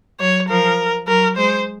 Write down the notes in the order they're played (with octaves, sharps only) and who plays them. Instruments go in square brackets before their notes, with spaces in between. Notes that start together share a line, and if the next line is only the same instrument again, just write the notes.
[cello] F#3 [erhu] C#5
[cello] F3 [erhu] A#4
[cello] F#3 [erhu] A#4
[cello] G#3 [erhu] C5